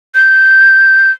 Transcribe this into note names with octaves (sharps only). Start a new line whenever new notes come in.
G6